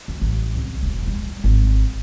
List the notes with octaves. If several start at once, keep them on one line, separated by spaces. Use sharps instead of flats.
F#2
A1
C2
E1
G3
G#1